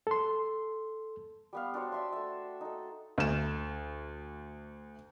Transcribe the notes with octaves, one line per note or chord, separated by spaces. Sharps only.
A4 C6
G3 B3 F5
D4 F#4 C5 C#5
D5 E5 C6
A3 E5
D#4 A4
D2 E7